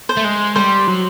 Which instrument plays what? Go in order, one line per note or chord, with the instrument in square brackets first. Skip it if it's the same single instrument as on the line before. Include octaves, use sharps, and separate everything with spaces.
[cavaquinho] C5
[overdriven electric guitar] A3
G#3
[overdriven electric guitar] G3 [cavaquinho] C5
[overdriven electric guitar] F#3